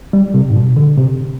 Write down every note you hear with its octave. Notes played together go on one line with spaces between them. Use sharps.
G3
C3
G#2
B2
D3
C3